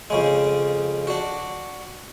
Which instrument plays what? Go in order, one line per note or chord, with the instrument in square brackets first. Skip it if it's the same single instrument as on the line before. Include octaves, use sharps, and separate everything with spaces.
[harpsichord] F2 C#3 G#3
D4 F#4